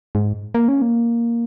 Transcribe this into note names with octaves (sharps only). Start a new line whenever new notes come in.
G#2
A#3
C#4
A#3